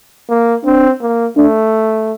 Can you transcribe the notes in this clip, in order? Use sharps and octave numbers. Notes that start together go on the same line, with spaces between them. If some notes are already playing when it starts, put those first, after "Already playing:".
A#3
C4 D4
A#3
A3 D4